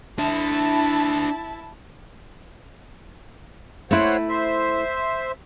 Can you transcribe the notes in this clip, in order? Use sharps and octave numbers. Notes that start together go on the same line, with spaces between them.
D4 E4 E5 A5
A3 E4 C5 C#5 F#5
C5 E5